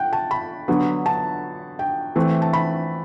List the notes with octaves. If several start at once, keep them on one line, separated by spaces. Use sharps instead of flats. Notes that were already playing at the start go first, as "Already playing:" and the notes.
Already playing: F#5 G5
A5
B5
D3 F#3 B3
A5
G5
E3 A3 C4
A5
B5